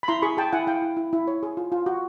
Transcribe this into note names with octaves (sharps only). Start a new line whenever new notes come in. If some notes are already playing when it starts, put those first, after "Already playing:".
B5
E4 A#5 C6
G#4 B5 C#6
G#4 G5 A5
E4 F#5 G#5
E4 F5 G5
E4
E4
E4
C#5
G#4
F4
F4
F#4